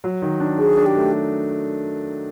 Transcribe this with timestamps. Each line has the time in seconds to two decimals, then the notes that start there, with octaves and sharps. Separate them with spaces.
0.04 F#3
0.22 D#3
0.40 D4
0.58 D4 G#4
0.77 D4
0.86 G4
0.96 A3